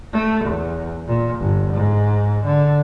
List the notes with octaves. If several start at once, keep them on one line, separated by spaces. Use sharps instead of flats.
A3
E2
A#2
G1
G#2
D3